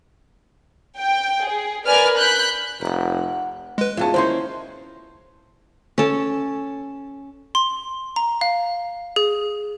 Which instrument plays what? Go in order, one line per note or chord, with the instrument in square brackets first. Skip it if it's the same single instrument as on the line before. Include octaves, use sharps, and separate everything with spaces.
[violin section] G5
G#4
A#4 B4 D5 G#5 F6
B5 F#6 G6
[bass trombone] F1 [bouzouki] A#4 F#5
[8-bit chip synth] G#3 B4
[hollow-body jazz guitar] E2 G#2 C#4 [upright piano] F4 A5
[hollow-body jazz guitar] D#3 A#3 C#4 [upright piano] E4 [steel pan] C5 C6
[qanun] C#4 A4
[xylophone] C6
A#5
F5
G#4